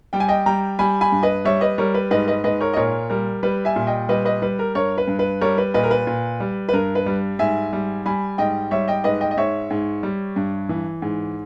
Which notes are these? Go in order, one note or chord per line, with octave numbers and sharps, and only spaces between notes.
G3 G5
G#5
D#5 G5
G3 G5 A#5
G3 G#5 B5
G#5 B5
G2
B4 D#5
G3 C#5 E5
B4 D#5
G3 A#4 C#5
B4
G#2 B4 D#5
B4 D#5
G#2 B4 D#5
A#4 C#5
D#5
A#2 A#4 C#5
G3 A#4
G3 B4
E5 G#5
A#2
D#5 G5
G3 B4 D#5
B4 D#5
G3 B4
A#4
G2 A#4 C#5
B4
G2
B4
G3 A#4 C#5
B4
A#2 B4 D#5
A#4
B4
A#2
G3
B4
G2 A#4
B4
G3
G#2 E5 G#5
G3
G3 G#5 B5
G#2 D#5 G5
G3 C#5 E5
D#5 G5
G#2 B4 D#5
D#5 G5
D#5
G#2 C#5 E5
G#2
G3
G2
E3
G#2